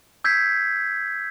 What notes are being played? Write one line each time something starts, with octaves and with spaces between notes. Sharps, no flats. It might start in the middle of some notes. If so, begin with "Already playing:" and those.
E6 G6 G#6 B6 C7